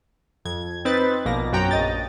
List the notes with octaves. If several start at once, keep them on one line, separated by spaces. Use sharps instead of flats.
F2 G#6
C4 D#4 B4 A6
A#1 B2 A#3 A#6
F#2 F#4 G5 A#5 G6
A#1 D#5 A6